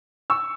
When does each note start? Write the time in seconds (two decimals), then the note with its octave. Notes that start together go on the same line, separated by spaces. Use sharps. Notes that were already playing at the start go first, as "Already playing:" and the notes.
0.30 C#6 E6